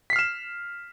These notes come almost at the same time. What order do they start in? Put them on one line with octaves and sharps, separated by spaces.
B6 C7 F6 E7